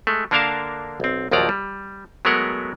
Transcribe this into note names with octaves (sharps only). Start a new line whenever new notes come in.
G#3 A3
D3 A#3 D4 A#4 F5 A5
B1 C4
A#1 D#2 F3 F#3 D5 A#5
G3
F#3 G#3 A3 B3 A#4 F#5